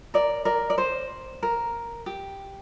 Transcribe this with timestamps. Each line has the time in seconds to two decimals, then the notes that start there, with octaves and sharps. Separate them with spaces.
0.14 A#4 D5
0.45 A#4 D5
0.70 D5
0.78 C5
1.43 A#4
2.06 G4